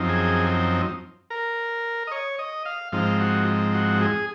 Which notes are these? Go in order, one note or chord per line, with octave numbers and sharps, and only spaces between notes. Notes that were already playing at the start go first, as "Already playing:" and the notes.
Already playing: F#2 F3 C4 D#4
G#4
A#4
D#5
C#5
D#5
F5
G#2 F3 C4 D#4 F5
F#4
F#4
G#4